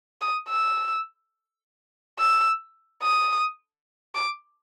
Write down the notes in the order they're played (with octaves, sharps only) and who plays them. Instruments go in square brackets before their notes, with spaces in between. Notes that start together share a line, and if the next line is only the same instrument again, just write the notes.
[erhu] D#6
E6
E6
D#6
D6